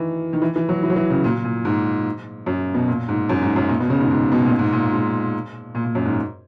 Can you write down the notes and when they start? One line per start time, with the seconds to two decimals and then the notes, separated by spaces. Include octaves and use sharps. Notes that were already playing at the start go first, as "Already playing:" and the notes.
Already playing: D#3 E3
0.33 D#3
0.42 E3
0.56 E3
0.69 F#3
0.83 E3
0.90 F#3
0.96 E3
1.10 C#3
1.24 A#2
1.44 A#2
1.65 G#2
2.46 F#2
2.74 B2
2.88 A#2
3.08 G#2
3.29 F#2
3.43 G#2
3.56 F#2
3.69 A#2
3.80 B2
3.90 C#3
4.00 G#2
4.10 G#2
4.32 B2
4.45 A#2
4.59 G#2
4.72 A#2
4.93 G#2
5.75 A#2
5.85 A#2
5.95 F#2
6.05 G#2